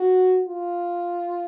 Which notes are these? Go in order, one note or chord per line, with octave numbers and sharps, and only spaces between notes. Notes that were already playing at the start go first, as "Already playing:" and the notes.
Already playing: F#4
F4